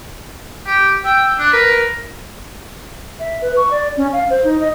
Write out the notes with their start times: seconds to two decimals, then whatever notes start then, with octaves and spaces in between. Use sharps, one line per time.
0.67 G4
1.05 G5 E6
1.39 D4 F#6
1.53 A#4 B4
3.19 E5
3.41 B4
3.56 C#6
3.71 D5
3.97 C#4
4.13 F5
4.30 C5
4.44 D#4
4.60 D#5